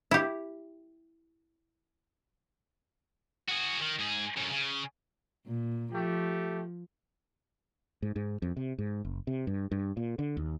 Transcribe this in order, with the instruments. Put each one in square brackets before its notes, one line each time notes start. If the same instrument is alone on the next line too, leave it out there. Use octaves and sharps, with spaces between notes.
[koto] E4 G4
[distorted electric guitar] F#4 G#4
D#3
G#2 G#4
F#2 A2
C#3
[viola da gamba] A#2
[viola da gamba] F3 [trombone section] A3 G4
[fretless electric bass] G#2
G#2
F2
C3
G#2
F#1
C3
G2
G2
A#2
D3
D#2